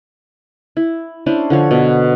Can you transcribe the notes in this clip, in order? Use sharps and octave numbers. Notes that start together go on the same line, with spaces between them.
E4
C#4 D4 E4 C5
D3 F3 C#5
B2